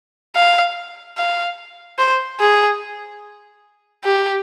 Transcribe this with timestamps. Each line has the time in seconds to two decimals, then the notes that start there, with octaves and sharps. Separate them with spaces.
0.36 F5
1.17 F5
1.98 C5
2.40 G#4
4.04 G4